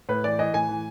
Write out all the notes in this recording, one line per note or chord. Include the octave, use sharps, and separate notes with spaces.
A2 B4
E3 D5
E3 D#5
A2 G#5
E3